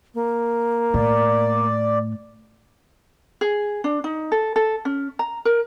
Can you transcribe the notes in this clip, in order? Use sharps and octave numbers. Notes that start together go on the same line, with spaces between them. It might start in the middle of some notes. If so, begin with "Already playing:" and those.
A#3
A2 D5
G#4
D4
D#4
A4
A4
C#4
A#5
A#4